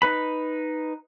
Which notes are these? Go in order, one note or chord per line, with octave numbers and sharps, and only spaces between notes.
D#4 B4 B5